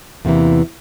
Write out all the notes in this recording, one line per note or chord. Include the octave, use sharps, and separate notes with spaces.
E2 C3 E3 A#3